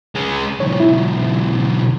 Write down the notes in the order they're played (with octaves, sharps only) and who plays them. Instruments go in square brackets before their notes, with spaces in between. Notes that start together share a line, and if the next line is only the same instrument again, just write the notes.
[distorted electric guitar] G#3 C#4
[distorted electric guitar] B1 G#2 [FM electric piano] C#5
[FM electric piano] E4